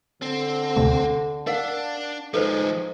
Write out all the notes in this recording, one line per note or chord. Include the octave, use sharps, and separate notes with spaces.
D3 C4
D2 C3 A3
D4 A#4 D5 F5 F#5
F3 G#3 D#4 A4 B4 C5